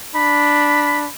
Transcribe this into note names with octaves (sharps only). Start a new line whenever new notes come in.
D4 B5